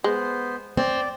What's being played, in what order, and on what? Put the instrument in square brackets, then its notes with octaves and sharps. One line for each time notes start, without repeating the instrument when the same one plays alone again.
[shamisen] G#3 [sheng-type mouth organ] B3 C5
[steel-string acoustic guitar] C4 [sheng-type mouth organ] D5